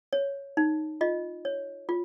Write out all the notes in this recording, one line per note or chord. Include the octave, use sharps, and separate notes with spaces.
C#5
D#4
F4 D#5
C#5
F4